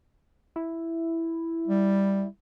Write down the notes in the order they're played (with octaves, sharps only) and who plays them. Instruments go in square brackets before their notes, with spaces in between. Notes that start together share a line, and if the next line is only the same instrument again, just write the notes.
[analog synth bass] E4
[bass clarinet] G3